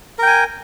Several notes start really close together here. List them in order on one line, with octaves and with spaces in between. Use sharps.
A#4 G5 G#5